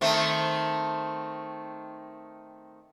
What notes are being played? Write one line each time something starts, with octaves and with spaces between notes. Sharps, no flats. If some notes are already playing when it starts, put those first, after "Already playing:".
D#3 A3 C4